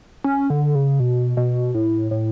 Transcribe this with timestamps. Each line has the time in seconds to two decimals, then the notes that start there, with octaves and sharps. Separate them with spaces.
0.24 C#4
0.50 D3
0.75 C#3
1.00 B2
1.37 B2
1.74 A2
2.11 A2